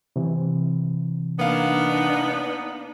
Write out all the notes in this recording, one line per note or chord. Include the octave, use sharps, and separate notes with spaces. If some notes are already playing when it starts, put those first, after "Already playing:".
C3 E3
A#3 B3 D4 D#4 F5